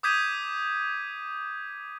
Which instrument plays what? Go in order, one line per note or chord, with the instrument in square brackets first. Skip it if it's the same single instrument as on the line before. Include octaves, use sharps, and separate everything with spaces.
[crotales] D6 D#6 G6 G#6 B6 D#7